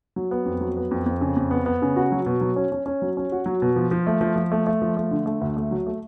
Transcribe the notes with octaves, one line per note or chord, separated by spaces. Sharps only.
F#3
B3
F2
F#3
B3
F2
F2
C#3
F2
B3
B3
C#3
F#4
F#3
B2
F#3
C#4
C#4
C#4
F#3
C#4
F#4
F#3
B2
F3
F3
A3
F3
F3
A3
A3
F3
A3
D3
A3
D2
A3
F#3
A3